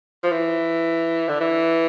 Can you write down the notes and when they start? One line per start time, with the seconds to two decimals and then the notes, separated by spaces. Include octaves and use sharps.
0.24 F3
0.32 E3
1.29 D3
1.41 E3